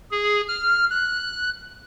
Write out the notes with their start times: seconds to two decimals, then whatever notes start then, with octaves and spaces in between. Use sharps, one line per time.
0.11 G#4
0.48 F6
0.90 F#6